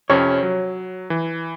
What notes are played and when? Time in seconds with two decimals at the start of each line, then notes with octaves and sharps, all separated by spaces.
0.10 F2 C3 C#4 C#5
0.43 F#3
1.10 E3